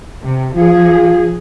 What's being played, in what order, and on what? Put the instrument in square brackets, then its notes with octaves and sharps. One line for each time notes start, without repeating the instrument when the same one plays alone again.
[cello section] C3
[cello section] F3 G#4 [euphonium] F4